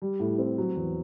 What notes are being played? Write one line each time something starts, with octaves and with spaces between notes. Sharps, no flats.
G3
A2
C4
F#3
E2